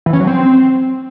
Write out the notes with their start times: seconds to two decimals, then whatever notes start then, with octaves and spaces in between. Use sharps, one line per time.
0.06 E3
0.13 C#4
0.20 F#3
0.27 C4